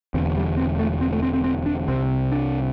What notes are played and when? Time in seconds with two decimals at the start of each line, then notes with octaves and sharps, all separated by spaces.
0.14 E1 E2 D3 C4
0.37 G3
0.57 C4
0.79 A3
1.01 C4
1.13 A3
1.23 C4
1.33 C4
1.44 C4
1.66 D4
1.88 C2 C3 C4
2.32 D4